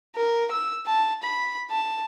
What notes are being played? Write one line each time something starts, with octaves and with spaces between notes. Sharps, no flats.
A#4
E6
A5
B5
A5